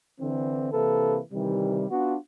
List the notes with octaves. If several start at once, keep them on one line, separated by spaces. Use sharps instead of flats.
D3 E3 C4
C3 E3 A#3 E4 A4 B4
C3 D#3 E3 G3
B3 D4 F4 F#4